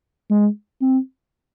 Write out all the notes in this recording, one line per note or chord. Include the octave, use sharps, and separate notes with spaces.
G#3
C4